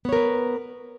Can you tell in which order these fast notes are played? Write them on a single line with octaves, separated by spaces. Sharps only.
B3 C#5 A#4 B4